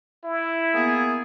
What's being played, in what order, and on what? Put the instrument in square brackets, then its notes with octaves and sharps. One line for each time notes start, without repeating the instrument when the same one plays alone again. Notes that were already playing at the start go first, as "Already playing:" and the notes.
[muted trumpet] E4
[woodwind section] A#3 B3 G#4